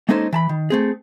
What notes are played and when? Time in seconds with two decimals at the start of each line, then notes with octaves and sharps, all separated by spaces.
0.09 G#3 A#3 C#4 D#4 A4 C5
0.33 E3 A5 B5
0.49 D#3
0.70 A3 C4 G#4